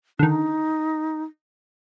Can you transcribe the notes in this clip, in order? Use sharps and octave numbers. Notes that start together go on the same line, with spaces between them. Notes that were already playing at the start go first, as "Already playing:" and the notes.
D3 D#3 D#4